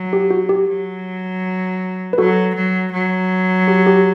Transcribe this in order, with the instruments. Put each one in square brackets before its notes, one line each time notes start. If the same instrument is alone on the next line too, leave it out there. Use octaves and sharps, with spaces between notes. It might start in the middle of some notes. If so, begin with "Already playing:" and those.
Already playing: [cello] F#3
[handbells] G4
F#4
G4
[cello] F#3
[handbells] B4
[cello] F#3 [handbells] F#4 A4
[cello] F#3
F#3
[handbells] G4
G4